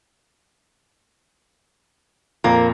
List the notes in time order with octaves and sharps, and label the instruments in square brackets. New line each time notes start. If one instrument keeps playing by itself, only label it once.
[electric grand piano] F2 A#2 A#5 [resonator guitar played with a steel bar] A#3